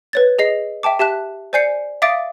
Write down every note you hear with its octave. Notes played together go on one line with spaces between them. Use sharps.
B4 C#5 A6
G#4 D#5 C7
E5 G5 A5 D6
G4 E5 A5 F#6
C5 D5 G#5 G6 C7 C#7
E5 F5 D6 D#6 A6 D7